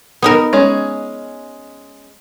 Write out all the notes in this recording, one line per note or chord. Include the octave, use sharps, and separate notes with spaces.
B3 D#4 A#4
G#3 C#4